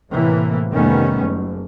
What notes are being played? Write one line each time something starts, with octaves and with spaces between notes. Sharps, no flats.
A2 C3 E3 A#3
F1 D#3 G3 A3 B3 C#4
F#1